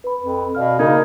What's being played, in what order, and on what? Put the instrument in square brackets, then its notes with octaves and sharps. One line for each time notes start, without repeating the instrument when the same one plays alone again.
[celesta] B4 B5
[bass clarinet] F2
[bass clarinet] B2 [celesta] D5 F5 F6
[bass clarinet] C#3 [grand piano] A#3 [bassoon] D#4 [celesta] G#6